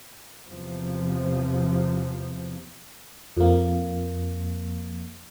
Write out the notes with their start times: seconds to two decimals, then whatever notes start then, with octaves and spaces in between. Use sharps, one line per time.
0.48 E2 C3 F3
3.37 F2 A#3